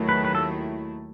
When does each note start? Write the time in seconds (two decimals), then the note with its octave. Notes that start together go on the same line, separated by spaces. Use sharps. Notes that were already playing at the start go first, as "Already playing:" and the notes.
Already playing: D#2 D#3 F#3 A3 E4
0.09 B4
0.25 B4
0.35 A4